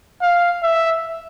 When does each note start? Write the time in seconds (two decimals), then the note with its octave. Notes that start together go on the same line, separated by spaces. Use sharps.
0.22 F5
0.62 E5